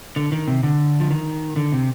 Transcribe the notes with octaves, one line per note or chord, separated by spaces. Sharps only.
D3
D#3
C3
D3
F3
D#3
D3
C3